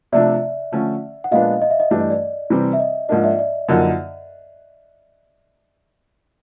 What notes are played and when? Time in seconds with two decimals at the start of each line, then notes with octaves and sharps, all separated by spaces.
0.12 C3 F3 A3 D4 D5 E5
0.72 D3 F3 A3 C#4
1.24 F#5
1.31 A#2 F3 G#3 B3 D4 D#5 F5
1.62 D#5
1.70 E5
1.80 D#5
1.91 G2 E3 A3 D4 G4 D5
2.01 D#5
2.10 D5
2.50 C3 E3 G3 C4
2.73 E5
2.79 D#5
3.09 G#2 F3 A#3 D4 D#5
3.24 D5 E5
3.39 D5
3.68 F#2 D3 F3 A#3 D#4